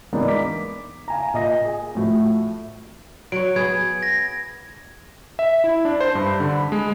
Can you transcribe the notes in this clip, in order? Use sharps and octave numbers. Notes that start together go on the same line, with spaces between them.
E3 G#3 A#3 B3 D4 D#4
D6 B6
F5 G#5 A#5
A#2 D#5 A#6
G#4
A2 F3 A3 F#4
F#3 C#5 D7
B3 G#4 G#6
A#6
E5
E4
D4
C5
G2
D3
B5
G#3